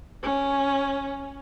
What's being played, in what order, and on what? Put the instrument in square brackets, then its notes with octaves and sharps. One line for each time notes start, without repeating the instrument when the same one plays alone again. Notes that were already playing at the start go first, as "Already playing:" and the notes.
[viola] C#4